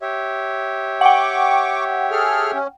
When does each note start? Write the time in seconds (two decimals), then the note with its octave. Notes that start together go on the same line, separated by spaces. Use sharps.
0.02 G4 C#5 E5
1.01 F#5 G5 C#6 D6
2.11 G#4 A4 F6
2.54 C#4